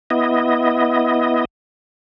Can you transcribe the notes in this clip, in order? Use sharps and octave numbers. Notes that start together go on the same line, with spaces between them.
B3 E4 D#5